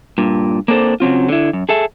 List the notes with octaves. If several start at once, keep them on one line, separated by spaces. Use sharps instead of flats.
G2 A#2
A#3 C4 D4 A4 C5
C#3 F#3 C4 F4
D3 E4
F#2
G#4 A4 E5